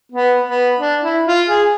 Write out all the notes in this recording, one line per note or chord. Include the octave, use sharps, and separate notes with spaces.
B3
B3
D4
E4
F4
G#4